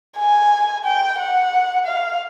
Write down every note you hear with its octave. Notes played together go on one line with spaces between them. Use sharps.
G#5
G5
F#5
F5